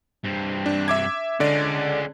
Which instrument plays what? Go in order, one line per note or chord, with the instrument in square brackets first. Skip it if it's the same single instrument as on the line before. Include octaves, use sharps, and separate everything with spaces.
[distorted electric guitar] G2 C4
[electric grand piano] D4
E5 D6 G#6
[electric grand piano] D3 D5 [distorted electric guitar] G#3 C#4